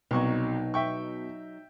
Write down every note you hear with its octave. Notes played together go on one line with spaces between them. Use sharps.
C2 B2 F#3 D#4 C#6
E5 G5 C#6